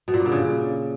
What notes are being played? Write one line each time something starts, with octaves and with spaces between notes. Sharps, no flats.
B2
A#2
G2
D3
C#3